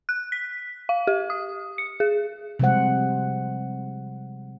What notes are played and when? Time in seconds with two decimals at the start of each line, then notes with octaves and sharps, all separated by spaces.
0.09 F#6
0.32 B6
0.89 F5
1.07 G4
1.30 D#6
1.78 C#7
2.00 G#4
2.59 C3 F3 G3 G#3 C5 F#5